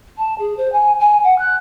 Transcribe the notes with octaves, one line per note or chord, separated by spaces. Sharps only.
A5
G#4
C5
G#5
G#5
F#5
F#6